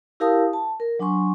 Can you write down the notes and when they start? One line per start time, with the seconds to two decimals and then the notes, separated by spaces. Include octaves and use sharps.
0.20 E4 G4 A#4 F5 A5 D#6
0.53 A5
0.80 A#4
0.99 F#3 D4 G#5 C6 C#6